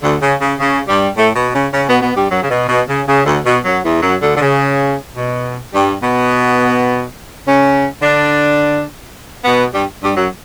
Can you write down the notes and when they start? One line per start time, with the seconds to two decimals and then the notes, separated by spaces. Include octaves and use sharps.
0.03 D2 D3
0.21 C#3
0.41 C#3
0.59 C#3
0.88 G2 G3
1.17 A2 A3
1.36 B2 B3
1.55 C#3 C#4
1.74 C#3 C#4
1.88 B2 B3
2.02 B2 B3
2.16 G2 G3
2.31 F#2 F#3
2.43 C#3
2.50 B2
2.69 B2
2.88 C#3
3.08 C#3
3.26 D2 D3
3.45 B2
3.65 F#2 F#3
3.83 E2 E3
4.02 F#2 F#3
4.21 D2 D3
4.35 D3
4.41 C#3
5.17 B2
5.74 G2 G3
6.03 B2 B3
7.46 C#3 C#4
8.02 D3 D4
9.45 B2 B3
9.74 G2 G3
10.03 G2 G3
10.17 F#2 F#3